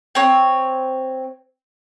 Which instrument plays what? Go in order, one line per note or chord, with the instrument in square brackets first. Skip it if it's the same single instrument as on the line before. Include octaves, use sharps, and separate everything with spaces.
[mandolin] C4 C#5